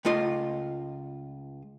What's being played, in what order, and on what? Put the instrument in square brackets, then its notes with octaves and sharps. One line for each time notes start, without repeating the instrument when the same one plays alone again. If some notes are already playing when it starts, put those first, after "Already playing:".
[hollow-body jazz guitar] C#2 A3 F4 D#5 C6